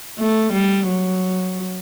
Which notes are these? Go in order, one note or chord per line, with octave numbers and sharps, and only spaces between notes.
A3
G3
F#3